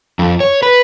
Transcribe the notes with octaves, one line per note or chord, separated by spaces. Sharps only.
F2
C#5
B4